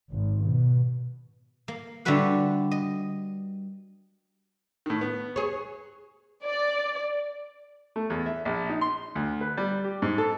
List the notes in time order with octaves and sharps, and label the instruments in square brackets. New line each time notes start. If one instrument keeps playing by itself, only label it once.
[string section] G#1
B2
[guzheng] A#3
D3 G3 E4 F#4 B4 F#5
D#5
[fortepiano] A2 D#3
B3
[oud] G#4 C#5
[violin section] D5
[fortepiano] A3
E2
E5
A#1
D#4
C6
D2
B4
G3
G4
G#2
A4